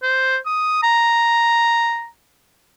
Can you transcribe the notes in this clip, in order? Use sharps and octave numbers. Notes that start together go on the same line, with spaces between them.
C5
D#6
A#5